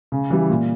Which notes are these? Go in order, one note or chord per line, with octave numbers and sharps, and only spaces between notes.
C#3
E3 G3
A#2